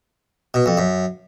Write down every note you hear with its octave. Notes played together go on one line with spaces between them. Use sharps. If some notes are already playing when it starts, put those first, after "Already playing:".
B2
F2
F#2